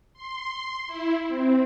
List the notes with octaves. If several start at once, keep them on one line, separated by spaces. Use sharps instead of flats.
C6
E4
C4